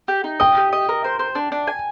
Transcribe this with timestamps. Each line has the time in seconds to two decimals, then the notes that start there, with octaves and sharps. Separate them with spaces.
0.08 G4
0.24 D#4
0.40 D#5 G5
0.57 G4
0.73 D#5
0.89 A#4
1.04 C5
1.19 C5
1.35 D4
1.52 D4
1.67 G#5